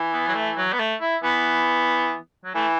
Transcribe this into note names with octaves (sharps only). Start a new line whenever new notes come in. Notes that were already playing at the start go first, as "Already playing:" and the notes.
Already playing: E3
B3
F#3
A3
F#3
B3
A3
E4
E3 B3
F#3
E3 A3